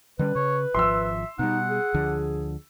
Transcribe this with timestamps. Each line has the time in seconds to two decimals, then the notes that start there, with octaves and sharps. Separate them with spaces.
0.19 D3 G3 C#4 B4
0.36 C#3 C#5
0.75 G#1 F3 E5 C6 E6
1.39 B2 G3 D#4 F#5
1.70 G#4
1.94 D2 D3 F3